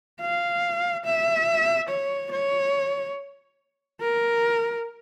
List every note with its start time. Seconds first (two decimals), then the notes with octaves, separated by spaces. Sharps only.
0.21 F5
1.05 E5
1.89 C#5
2.32 C#5
4.01 A#4